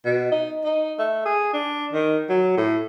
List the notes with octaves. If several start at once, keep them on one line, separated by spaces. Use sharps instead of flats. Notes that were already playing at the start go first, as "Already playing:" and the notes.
B2
D#4
D#4
A3
G#4
D4
D#3
F#3
A2